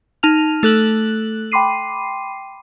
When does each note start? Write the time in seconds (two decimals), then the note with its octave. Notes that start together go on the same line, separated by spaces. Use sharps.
0.23 D#4 A5 F6 F7
0.63 A3 A4 F#6 F#7
1.52 G5 B5 C6 D6 C7 D#7